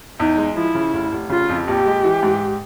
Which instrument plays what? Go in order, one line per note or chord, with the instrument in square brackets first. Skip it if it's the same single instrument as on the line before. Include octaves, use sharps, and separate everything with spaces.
[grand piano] E2 [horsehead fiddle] D#4
[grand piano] G#3
[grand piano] F3 [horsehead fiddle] E4
[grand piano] C#3
F1
F1
[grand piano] C#3 [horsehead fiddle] F4
[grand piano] F2
[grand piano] A#1 [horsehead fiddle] G4
[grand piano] G#3
E3
G#2